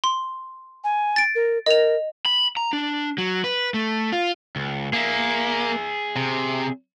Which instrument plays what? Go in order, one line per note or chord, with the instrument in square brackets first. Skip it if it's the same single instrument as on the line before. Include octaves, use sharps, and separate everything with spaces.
[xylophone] C6
[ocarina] G#5
[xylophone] A6 D7
[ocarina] A#4
[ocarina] A#4 [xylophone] D#5 F7
[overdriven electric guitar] B5
A#5
D4
F#3
B4
A3
F4
C#2
[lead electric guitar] A#3 [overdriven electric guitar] G#4 E5
[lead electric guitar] C3